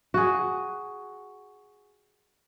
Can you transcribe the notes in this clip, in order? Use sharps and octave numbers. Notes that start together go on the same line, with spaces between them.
F#4 G#4